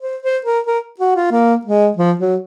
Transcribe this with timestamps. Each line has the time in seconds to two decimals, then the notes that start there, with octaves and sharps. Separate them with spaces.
0.02 C5
0.23 C5
0.45 A#4
0.67 A#4
1.00 F#4
1.16 F4
1.31 A#3
1.65 G#3
1.97 F3
2.20 F#3